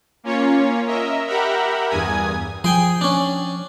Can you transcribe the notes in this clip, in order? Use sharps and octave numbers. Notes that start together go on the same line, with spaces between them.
A#3 C#4 F4 C#5
A#4 D#5 E5 A#5
G4 A#4 E5 F#5 A#5 B5
E2 G2 G#5 D#6 G#6
F3 G#4 G5 G#5
C#4 D4